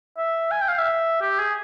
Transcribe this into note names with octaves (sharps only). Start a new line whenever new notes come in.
E5
G#5
G5
F5
E5
G4
G#4